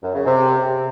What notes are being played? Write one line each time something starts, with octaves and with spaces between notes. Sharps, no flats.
F#2
C#3
C3